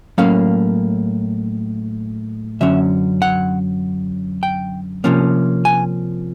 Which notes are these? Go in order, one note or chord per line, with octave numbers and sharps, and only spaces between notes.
A2 F#3 A#3 C#4 F5
F#2 D3 F#3 C#4 E5
F#5
G5
C3 F3 A#3 C#4
G#5